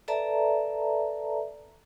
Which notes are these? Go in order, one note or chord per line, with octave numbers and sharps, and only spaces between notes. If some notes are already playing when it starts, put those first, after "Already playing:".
A4 B4 D5 E5 A5 A#5